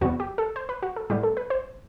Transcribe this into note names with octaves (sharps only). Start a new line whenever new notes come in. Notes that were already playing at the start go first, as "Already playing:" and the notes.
E2 C3 G3 B3 F#4
G4
A4
C5
B4
F#4
A4
A2 G3 B3 G4
A4
B4
C5